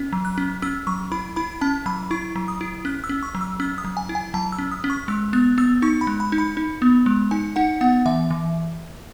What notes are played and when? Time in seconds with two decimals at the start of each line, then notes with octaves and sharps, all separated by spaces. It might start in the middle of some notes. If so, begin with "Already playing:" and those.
Already playing: C#4
0.13 F#3
0.25 F#6
0.38 C#4
0.62 C#4 E6
0.87 F#3 C#6
1.12 E4 B5
1.36 E4 B5
1.61 C#4 A5
1.86 F#3 B5
2.11 E4 C#6
2.36 F#3
2.48 D#6
2.61 E4
2.85 C#4 F#6
3.04 E6
3.09 C#4
3.23 C#6
3.35 F#3
3.41 E6
3.60 C#4 E6
3.78 D#6
3.85 F#3
3.97 G#5
4.09 E4
4.15 G#5
4.34 F#3 A5
4.52 E6
4.58 C#4
4.71 D#6
4.84 C#4
4.90 C#6
5.08 G#3 E6
5.33 B3 F#6
5.58 B3 E6
5.82 D#4 C#6
6.01 B5
6.07 G#3
6.20 B5
6.32 D#4
6.38 B5
6.57 D#4
6.82 B3
7.06 G#3
7.31 D#4 G#5
7.56 D#4 F#5
7.81 B3 F#5
8.06 E3 E5
8.31 E3